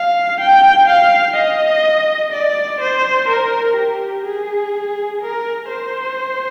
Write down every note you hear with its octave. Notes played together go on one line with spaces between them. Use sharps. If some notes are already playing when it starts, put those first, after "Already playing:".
Already playing: F5
G5
F5
D#5
D5
C5
A#4
G4
G#4
A#4
C5